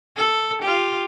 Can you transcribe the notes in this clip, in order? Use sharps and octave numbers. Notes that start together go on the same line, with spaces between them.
A4
F4 G4